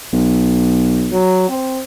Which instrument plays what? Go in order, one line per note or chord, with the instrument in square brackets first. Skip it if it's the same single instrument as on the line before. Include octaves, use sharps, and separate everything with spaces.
[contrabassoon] B1
[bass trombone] F#3
C4